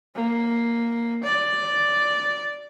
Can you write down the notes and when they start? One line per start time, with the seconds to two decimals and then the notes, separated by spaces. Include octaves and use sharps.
0.15 A#3
1.24 D5